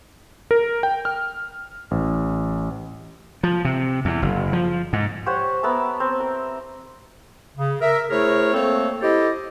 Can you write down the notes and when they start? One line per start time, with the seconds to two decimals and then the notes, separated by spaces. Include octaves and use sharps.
0.51 A#4
0.83 G5
1.05 F6
1.91 A1
3.43 F3
3.65 C3
4.05 E2
4.22 F#1
4.53 F3
4.93 G#2
5.26 G4 C5 C#5 F#5
5.63 B3 A#4 E5 A5
6.00 C4
6.20 A#4
7.56 C#3
7.81 A#4 E5
8.10 A3 E4 G#4 A#4 C5 C#5
8.53 A3 A#3 C4 A4 C5 C#5
9.01 E4 G4 A4 C5 D#5